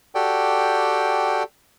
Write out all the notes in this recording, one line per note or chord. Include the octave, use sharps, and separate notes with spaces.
F#4 G4 A4 D5 G5